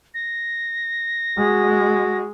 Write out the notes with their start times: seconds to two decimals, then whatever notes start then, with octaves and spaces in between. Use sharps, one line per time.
0.14 A#6
1.38 G#3 F#4